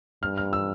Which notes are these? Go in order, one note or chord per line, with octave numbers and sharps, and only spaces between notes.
G2 F6
F6
E6